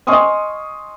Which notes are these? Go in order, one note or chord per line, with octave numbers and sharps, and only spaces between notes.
D#5 G#5 C6 C#6 D#6 F6